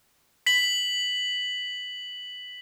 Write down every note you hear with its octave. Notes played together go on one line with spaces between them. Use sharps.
B6 F#7